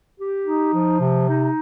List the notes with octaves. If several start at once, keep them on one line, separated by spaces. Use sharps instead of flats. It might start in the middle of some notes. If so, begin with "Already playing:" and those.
G4
D#4
F3
C3
D#4